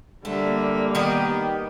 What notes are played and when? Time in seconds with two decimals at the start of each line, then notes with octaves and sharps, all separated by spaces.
0.25 D3 G3 A3 A#3
0.95 D#3 B3 G4 D#5